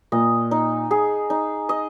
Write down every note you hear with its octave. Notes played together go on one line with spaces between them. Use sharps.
A#2 D#5
D#4
G#4
D#4
D#5